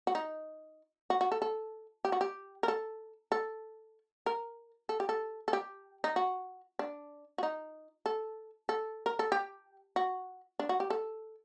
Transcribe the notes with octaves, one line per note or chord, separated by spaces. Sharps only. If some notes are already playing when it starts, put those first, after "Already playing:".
F#4
D#4
F#4
F#4
A4
A4
G4
F#4
G4
A#4
A4
A4
A#4
A4
G4
A4
A4
G4
D#4
F#4
D4
F#4
D#4
A4
A4
A#4
A4
G4
F#4
D4
F#4
G4
A4